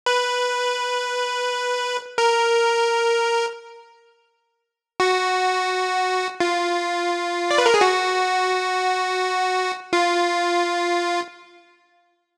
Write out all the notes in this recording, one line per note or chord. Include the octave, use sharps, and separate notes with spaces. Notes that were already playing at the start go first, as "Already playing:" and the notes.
B4
A#4
F#4
F4
D5
B4
A#4
G#4
F#4
F4